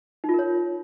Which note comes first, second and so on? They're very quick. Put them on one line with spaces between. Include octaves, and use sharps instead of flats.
D#4 F4 A#4 C#5